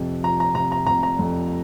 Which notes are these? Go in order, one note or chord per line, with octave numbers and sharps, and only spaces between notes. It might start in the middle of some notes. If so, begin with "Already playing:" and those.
Already playing: F2 C3
F3 A#5
A#5
C3 A#5
A#5
C3 A#5
A#5
F2